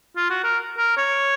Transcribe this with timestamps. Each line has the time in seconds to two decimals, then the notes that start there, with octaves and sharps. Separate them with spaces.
0.17 F4
0.30 F#4
0.44 A#4
0.78 A#4
0.97 C#5